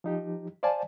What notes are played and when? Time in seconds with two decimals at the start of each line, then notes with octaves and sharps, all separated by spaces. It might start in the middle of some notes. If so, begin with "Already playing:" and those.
0.04 F3 D#4 G4
0.63 C5 D5 F5 G#5 A5